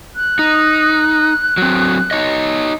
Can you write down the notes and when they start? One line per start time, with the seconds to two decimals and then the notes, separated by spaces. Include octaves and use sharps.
0.16 F#6
0.39 D#4
1.58 F#3 C4
2.11 D#4 C#5 D#5